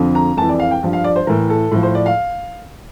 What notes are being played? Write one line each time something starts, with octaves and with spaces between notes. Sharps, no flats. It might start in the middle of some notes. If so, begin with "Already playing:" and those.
Already playing: F2 D3 F3
A#5
F2 E3 A5
D5
F5
G5
G2 F3
F5
D5
C5
A2 E3 A#4
A4
A2 F3
C5
D5
F5